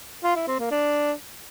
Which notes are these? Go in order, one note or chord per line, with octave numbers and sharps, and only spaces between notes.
F4
E4
C4
A#3
D4